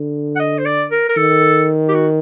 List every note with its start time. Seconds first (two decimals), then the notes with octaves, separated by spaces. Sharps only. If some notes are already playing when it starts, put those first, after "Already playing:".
Already playing: D3
0.36 F#5
0.39 D#5
0.58 C5
0.65 D5
0.91 A#4
1.09 A#4
1.16 D#3 A4
1.89 G4
1.94 F#4